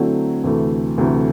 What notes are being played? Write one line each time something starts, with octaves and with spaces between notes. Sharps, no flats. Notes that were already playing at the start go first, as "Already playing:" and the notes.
Already playing: D3 F#3 A3 C4 E4
D2 C3 E3 A3
D2 C3 E3 A3